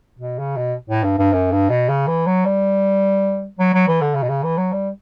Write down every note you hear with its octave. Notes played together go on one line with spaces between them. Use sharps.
B2
C#3
B2
A2
G2
G2
F#2
G2
B2
C#3
E3
F#3
G3
F#3
F#3
E3
D3
C#3
B2
C#3
E3
F#3
G3